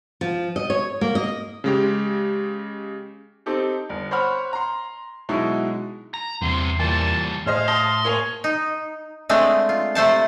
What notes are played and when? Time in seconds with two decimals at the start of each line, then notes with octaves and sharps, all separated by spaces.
0.21 F3
0.56 D#5
0.70 C#5
1.01 A#3
1.15 D#5
1.64 C#3 G#3 G4
3.46 C4 D#4 G4 A4
3.89 G1
4.11 C5 C#5 F#5 B5 F6
4.53 A#5 C6
5.29 B2 F#3 G#3 D#4 E4
6.14 A#5
6.42 E2 G2 C3 C6
6.79 A#2 E3 G3 A5
7.46 A2 G#4 C5 D#5 F5
7.68 A5 C6 D#6 A#6
8.05 A#3 C#5 G#5 F7
8.44 D#4
9.29 G#3 A3 C4 D4
9.69 F4
9.95 C3 A3 C5 A5